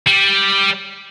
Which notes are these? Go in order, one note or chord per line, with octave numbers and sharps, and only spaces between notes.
G3